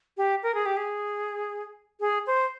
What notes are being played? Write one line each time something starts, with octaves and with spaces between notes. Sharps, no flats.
G4
A#4
G#4
G4
G#4
G#4
C5